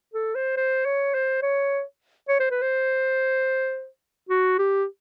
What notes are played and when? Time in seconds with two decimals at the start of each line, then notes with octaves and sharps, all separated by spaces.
0.14 A4
0.35 C5
0.57 C5
0.85 C#5
1.14 C5
1.43 C#5
2.28 C#5
2.40 C5
2.51 B4
2.62 C5
4.29 F#4
4.58 G4